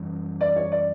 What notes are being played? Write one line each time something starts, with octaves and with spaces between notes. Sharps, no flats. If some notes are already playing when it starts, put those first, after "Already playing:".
Already playing: F#2 E3 G3 C#4
D5
C#5
D5